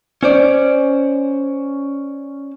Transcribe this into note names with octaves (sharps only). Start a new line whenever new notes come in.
C#4 C5 D5